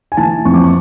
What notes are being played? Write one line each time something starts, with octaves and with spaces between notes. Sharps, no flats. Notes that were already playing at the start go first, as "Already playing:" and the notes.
G#5
E3 A5
F2 C#6
D6
C#6